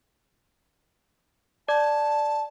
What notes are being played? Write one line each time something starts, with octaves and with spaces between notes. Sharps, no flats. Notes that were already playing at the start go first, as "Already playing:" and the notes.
D5 A5 D6 G#6